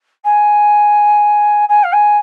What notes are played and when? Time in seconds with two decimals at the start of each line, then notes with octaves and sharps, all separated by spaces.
0.24 G#5
1.69 G#5
1.83 F5
1.92 G#5